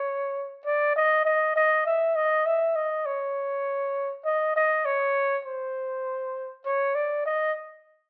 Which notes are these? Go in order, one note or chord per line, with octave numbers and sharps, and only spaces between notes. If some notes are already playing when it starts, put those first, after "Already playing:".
Already playing: C#5
D5
D#5
D#5
D#5
E5
D#5
E5
D#5
C#5
D#5
D#5
C#5
C5
C#5
D5
D#5